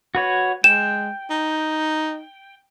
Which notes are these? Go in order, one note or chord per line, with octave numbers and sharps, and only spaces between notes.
F#4 B4 C#5
G#3 G5 E7
D#4